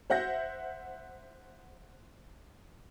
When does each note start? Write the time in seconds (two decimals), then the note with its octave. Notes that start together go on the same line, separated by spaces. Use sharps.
0.10 C5 E5 F#5 G6 A#6